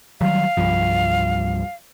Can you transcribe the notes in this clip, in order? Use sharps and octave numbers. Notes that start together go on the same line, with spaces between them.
D#3 F#3 G3 F5
C2 G2 F3